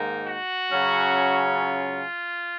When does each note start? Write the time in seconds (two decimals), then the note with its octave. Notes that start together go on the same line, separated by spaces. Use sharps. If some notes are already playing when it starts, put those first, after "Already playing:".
Already playing: G#2 D#3 A#3 D#4
0.28 F#4
0.70 C#3 F#3 C#4
1.54 F4